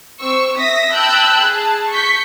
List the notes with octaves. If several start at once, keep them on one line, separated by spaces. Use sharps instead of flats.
C4 C#6 E6
E5 D#6 A#6 B6
G5 A5 B5 E6 F#6 G6
G#4 A5
C#6 G6 B6